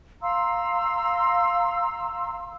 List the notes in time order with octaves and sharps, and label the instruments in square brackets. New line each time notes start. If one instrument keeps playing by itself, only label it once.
[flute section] F5 A#5 C6 E6